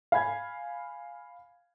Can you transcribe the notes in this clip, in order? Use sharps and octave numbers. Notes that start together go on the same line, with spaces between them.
F5 G#5 B5 G#6